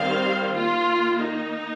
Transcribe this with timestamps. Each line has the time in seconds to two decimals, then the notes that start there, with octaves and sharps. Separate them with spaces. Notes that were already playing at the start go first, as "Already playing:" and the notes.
Already playing: D#3 G3 C4 C5 F5
0.54 D#3 A#3 F4
1.20 D#4